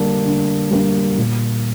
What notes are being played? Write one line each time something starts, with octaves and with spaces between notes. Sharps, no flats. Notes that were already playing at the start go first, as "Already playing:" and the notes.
Already playing: D3 G3 A#3 D4
D3
G3 A#3 D4
A#2